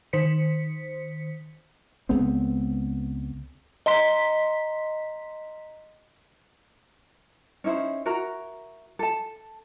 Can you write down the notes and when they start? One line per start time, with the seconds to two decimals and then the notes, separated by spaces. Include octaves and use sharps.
0.13 D#3 C5 B6 C#7
2.09 C#2 G#3 B3 C4
3.86 D#5 A#5 C6 B6
7.64 C#4 D#4 E4 C5
8.05 E4 F#4 A#4 A#5
8.99 A4 A5